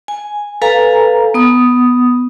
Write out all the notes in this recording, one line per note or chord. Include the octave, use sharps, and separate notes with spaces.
G#5
A4 B4 F5 G#5 A#5
B3 D#6